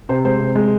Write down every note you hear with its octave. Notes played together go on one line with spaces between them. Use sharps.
C3 C5
G#3 C5
C3
G#3